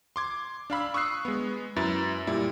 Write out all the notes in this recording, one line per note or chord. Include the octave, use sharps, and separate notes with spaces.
C6 D6 G#6
D4 F5 B5 E6
C#6 D#6 E6 F#6 C7
G#3 B3
F#2 E4 B4 A6
A#2 G3 E4